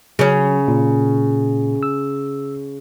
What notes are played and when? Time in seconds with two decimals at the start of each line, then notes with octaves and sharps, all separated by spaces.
0.19 C#3 F#3 C#4
0.68 A#2
1.83 E6